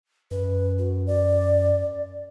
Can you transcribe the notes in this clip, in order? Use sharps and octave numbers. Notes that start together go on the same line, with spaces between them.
F#2 B4
F#4
D5